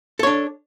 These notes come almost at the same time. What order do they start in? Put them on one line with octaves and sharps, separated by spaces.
A4 C#5 D4